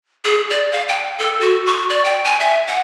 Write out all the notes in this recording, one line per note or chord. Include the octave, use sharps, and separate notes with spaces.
G#4
D5
F5
G5
A4
F#4
C#6
D5
G5
G#5
E5
F#5